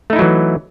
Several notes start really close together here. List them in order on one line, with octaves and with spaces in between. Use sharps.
A3 D#4 E4 F#3 E3